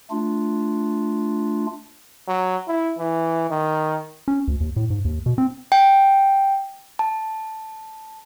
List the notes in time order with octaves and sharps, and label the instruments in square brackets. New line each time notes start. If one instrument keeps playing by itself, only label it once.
[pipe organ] A3 D4 F4
[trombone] F#3
E4
E3
D#3
[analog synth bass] C#4
D2
D#2
A2
G#2
D#2
B2
C4
[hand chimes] G5
A5